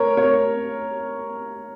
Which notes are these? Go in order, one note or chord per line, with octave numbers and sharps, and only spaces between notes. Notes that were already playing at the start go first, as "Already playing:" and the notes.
Already playing: A#4 C#5
C#5